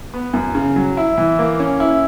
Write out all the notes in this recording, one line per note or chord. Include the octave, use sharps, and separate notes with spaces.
B3
F#2
C#3
F#3
E4
E3
A#3
C#4
E4